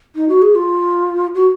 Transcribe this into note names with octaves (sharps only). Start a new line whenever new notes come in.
D#4
F#4
G#4
F4
F#4